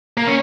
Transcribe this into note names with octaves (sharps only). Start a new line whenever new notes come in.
A#3
C#4